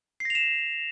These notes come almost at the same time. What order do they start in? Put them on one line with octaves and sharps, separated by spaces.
C7 A#6 F7 E7